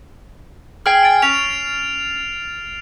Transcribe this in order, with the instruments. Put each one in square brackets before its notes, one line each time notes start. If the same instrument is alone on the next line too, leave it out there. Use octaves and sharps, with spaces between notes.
[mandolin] G#4 G5 G#5 [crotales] F6 C7
[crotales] A6 D7
[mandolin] C#4 [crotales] F7